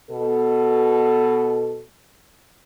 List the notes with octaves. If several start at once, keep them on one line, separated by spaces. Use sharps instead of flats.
B2 A4